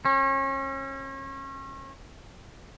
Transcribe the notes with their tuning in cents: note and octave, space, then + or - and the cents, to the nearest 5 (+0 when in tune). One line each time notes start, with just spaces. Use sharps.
C#4 -35